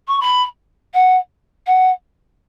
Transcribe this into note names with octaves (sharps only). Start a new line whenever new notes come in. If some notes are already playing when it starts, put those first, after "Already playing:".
C#6
B5
F#5
F#5